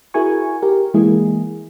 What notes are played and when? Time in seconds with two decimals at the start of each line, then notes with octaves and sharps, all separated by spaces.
0.14 E4 F#4 G#4 A#4 G#5 C#6
0.62 G4 A#4
0.94 E3 G#3 A#3 E4 G#4